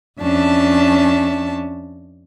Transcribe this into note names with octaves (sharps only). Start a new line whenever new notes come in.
F2 C#4 D4 E5 A5